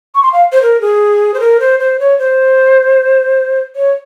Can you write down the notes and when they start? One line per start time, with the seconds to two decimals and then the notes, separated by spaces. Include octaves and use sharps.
0.15 C#6
0.23 C6
0.33 F5
0.52 C5
0.62 A#4
0.81 G#4
1.34 C5
1.40 A#4
1.60 C5
1.80 C5
1.99 C#5
2.19 C5
3.76 C#5